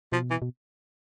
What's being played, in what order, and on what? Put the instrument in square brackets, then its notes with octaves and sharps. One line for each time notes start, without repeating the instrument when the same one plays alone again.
[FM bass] B2 [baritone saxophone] F3
[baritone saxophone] E3
[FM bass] B2